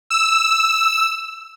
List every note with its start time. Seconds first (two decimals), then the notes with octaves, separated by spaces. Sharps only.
0.10 E6